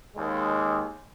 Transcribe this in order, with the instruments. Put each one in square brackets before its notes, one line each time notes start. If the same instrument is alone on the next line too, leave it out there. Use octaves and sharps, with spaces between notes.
[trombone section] D#2 G#3